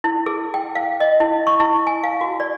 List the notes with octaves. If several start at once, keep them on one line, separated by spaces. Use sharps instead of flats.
E4
G#4
G5
F5
D#5
E4
C#6
E4
G#5
F5
F#4
D5